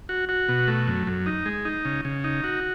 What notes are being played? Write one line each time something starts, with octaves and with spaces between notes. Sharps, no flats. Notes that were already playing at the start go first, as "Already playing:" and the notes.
F#4
F#4
B2
A3
F#2
F#2
D#4
G#3
D#4
C#3
C#3
D#4
F#4